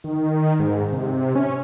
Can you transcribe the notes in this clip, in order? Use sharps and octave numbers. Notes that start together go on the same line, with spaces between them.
D#3
G#2
C3
C#4